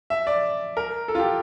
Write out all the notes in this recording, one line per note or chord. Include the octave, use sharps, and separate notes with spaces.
E5
D5
A#4
A4
F4
G4